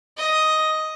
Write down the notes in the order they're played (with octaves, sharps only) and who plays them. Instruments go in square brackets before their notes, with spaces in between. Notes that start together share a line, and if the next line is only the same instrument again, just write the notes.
[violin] D#5